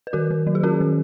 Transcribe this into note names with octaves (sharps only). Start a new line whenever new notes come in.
B4
D#3 F#4 A#4
D#3
F#3
G#4
C#4 F#4 A#4
D#3